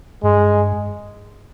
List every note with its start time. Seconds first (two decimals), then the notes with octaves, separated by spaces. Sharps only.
0.23 G2 G#3